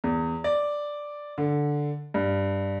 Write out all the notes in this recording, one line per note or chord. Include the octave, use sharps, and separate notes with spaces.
E2
D5
D3
G2